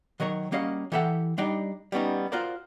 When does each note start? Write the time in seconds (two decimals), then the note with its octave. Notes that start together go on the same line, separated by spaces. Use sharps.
0.20 D#3 F#3 A#4 C#5
0.52 G3 A#3 C#4 F#4 D#5 F5
0.92 E3 G4 A4 E5 F#5
1.38 G3 D4 D#4 D5 G5
1.92 G3 B3 C#4 D#4
2.32 F4 F#4 A#4 C5 D5